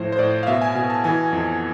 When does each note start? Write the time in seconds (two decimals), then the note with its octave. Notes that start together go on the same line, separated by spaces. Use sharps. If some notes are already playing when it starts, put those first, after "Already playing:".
Already playing: A2 F3 C5
0.12 C5
0.19 A2 D5
0.43 F5
0.47 B2 E5
0.62 G#5
0.75 B2 G#5
0.90 A5
1.04 E3 G#5
1.33 F2